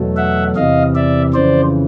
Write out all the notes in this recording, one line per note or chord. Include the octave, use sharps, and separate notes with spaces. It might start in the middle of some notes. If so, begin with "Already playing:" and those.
Already playing: E2 B2 F#3 A3
E5 F#5
E2 C3 E3 D#5 F5
D5 E5
F2 C#3 E3 C5 D5